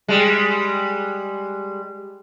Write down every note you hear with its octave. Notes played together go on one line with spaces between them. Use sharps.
G3 G#3